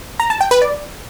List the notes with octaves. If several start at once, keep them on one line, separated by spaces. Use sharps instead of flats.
A#5
A5
G5
B4
D5